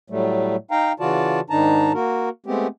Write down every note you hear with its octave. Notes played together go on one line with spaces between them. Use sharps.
A2 F#3 G3 A3
D#4 F5 G5 A#5
C#3 E3 F4 F#4 D5 A5
G#2 D#3 D4 D#4 A5 A#5
A#3 F#4 A#4
G#3 A3 B3 C4 G4